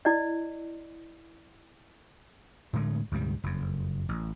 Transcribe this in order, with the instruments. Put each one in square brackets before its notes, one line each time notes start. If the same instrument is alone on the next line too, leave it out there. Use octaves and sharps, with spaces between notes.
[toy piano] E4 D5 D#5
[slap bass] A2 D3 G#3 A3
D2 G#2 C3 G3
F#1 F2
A1